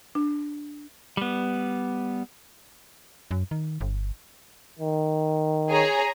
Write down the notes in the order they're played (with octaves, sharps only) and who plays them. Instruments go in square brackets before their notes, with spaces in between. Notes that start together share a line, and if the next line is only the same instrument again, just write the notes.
[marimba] D4
[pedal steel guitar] G3 B3
[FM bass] F#2
D#3
G1
[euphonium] D#3
[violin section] G#4 C#5 A#5